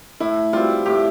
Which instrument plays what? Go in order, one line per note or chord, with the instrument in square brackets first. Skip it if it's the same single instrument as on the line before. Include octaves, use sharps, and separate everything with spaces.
[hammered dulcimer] A2 [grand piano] E4
[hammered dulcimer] G3 C4 [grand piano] F4
[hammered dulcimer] A2 [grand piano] G4